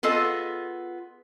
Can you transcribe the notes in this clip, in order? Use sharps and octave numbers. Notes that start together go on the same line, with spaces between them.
B3 F4 G#4 A4 D#5